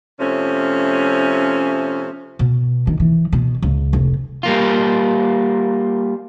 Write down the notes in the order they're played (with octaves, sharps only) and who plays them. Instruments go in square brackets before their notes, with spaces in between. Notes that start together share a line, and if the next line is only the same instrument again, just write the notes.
[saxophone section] C3 F3 A3 C#4
[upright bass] B2
D#3
E3
B2
C#2
F1
[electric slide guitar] G3 A#3 F4